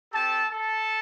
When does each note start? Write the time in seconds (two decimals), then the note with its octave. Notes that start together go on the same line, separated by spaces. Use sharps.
0.13 C4 G4 A4 A5
0.51 A4 A5